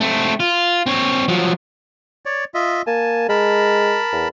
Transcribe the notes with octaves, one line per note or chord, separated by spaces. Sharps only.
A3 C4
F4
C4 C#5
F3 F#3
C#5 D5
F4 D#5 E5
A#3 G#5 A5
G#3 A#4 A5 B5
E2